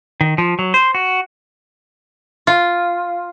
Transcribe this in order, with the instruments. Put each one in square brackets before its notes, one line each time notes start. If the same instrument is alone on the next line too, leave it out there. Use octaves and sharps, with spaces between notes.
[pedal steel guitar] D#3
F3
F#3
C5
F#4
[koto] F4